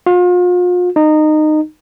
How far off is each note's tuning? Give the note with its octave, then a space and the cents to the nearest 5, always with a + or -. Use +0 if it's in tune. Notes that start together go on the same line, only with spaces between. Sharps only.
F4 +40
D#4 -20